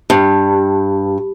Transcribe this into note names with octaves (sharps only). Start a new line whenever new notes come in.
G2